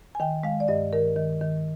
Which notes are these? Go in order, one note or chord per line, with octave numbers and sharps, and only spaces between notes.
G#5
D#3 G5
G#3 F5
D5
G2 D#5
D#3 A#4
D#3
D#3